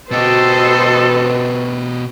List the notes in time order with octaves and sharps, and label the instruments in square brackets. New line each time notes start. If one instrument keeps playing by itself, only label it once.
[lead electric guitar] B2 G4 [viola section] F#4 B4 D#5 [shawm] A4 [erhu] C5